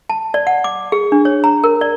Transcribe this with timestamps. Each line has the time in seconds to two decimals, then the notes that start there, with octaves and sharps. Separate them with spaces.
0.10 A5
0.34 D5
0.47 F#5
0.64 D6
0.92 G#4
1.12 D4
1.25 C#5
1.44 A#5
1.64 A#4
1.81 D5